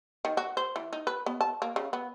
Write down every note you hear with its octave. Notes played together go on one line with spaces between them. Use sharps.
D#3
F#4
C5
E3
D#4
B4
B3
A5
A#3
C#3
B3